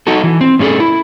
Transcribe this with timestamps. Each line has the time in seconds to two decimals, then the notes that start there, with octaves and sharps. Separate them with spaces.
0.07 D#4 F#4 A4
0.24 E3
0.41 C4
0.59 A2 C#4 F4 G#4 A4
0.80 E4